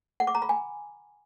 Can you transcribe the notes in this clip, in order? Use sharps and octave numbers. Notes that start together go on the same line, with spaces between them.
F#5
D6
A#5
B5
G#5